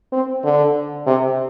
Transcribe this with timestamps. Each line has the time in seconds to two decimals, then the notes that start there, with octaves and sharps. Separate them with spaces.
0.13 C4
0.44 D3
1.07 C3